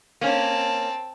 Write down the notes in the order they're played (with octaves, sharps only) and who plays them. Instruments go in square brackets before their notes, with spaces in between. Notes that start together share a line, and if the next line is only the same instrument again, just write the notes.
[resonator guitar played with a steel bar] A#3 C#4 [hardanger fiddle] C4 A5